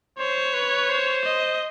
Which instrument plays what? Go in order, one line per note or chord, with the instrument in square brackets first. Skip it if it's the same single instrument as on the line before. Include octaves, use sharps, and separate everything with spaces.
[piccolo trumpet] C5 [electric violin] C#5
[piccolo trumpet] B4
C5
[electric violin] D#5